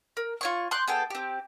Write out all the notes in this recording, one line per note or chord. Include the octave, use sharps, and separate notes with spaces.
A#4
F4 C#5 C#6
C6 D6 F#6 G6
B3 G#4 A4 G5
C4 G4